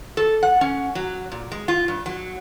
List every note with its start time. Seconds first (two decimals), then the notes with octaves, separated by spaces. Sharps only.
0.17 A4
0.43 F#5
0.61 C#4
0.95 F#3
1.32 A#2
1.52 G#3
1.68 F4
1.88 G2
2.06 F#3